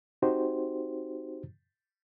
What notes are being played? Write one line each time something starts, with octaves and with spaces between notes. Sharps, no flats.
C4 D#4 F#4 G4 C5